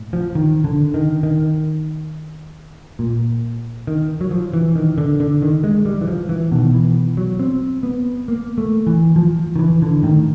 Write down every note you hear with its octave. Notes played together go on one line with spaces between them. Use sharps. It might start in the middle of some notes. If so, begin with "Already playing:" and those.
Already playing: A2
F3
D#3
D3
D#3
D#3
A#2
D#3
F#3
F3
E3
D#3
D3
D3
D#3
G#3
G3
E3
F3
E3
B2 D#3
E3
F#3
C4
B3
A#3
A3
E3
F3
D#3
E3
D3
A2 D#3